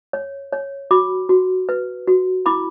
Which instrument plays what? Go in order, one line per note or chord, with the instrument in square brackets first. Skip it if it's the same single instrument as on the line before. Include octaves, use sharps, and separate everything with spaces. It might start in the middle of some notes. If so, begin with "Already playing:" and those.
[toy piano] C#5
C#5
F#4 B5 D6
F#4
B4
F#4
E4 B5 D6